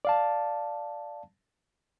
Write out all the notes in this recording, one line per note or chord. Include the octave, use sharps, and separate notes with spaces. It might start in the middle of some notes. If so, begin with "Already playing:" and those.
D5 F5 A5